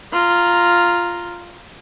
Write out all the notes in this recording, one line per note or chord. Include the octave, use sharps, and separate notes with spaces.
F4 A#5